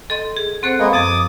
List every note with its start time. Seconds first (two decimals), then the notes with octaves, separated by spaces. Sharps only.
0.10 A4 D#5 C6
0.37 G#4
0.63 C4 A4 C5 F#5
0.79 G#3 A#3 B3
0.93 F#2 F3 D6 D#6